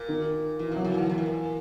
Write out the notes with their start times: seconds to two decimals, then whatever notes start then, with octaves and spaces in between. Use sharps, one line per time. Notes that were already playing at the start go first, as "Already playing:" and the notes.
Already playing: A#2
0.09 D#3
0.59 A#2 E3
0.72 C3 F#3
0.84 C#3
0.94 E3
0.97 D3
1.10 A#2 E3
1.18 A2
1.26 A#2